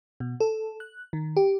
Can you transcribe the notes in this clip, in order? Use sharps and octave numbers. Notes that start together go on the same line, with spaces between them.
B2
A4
F#6
D#3
G4